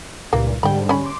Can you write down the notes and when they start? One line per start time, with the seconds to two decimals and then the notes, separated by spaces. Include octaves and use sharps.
0.33 C#2 G2 A#2 E3 A#3
0.63 G#2 D3 G3 G5 B5
0.89 C#4 B5
1.03 C6 D6